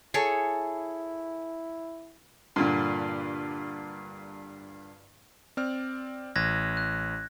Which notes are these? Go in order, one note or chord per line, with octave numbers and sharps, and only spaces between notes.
E4 G#4 A4 C#5
G2 A#2 D3
C4 D5 F6
A1 F#6 G#6 A#6
F#6